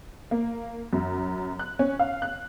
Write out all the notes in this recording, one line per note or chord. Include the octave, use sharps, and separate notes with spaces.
A#3
F#2
F#6
C#4
F5
F#6